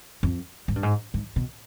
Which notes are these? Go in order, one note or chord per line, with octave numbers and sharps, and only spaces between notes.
F2
G#2
G2
G#2
G#2
B2